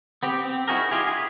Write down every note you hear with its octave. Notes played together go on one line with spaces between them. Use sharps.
B3 C4 G4
C4
D#4 E4 F#4 G#4 A#4
E4 F4 G4 G#4
G#4 B4